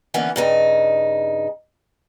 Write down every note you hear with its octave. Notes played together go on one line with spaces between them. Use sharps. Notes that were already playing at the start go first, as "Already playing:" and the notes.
D3 E3 A#3 B3 C#4
G2 C#3 D#4